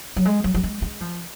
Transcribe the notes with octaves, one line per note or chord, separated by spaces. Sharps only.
F#3
G#3
F#3
F#3
G#3
G#3
F3